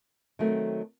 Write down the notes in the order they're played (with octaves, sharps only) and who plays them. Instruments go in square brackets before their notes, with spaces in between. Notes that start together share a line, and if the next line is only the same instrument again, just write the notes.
[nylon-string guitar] D#3 F#3 A3 C4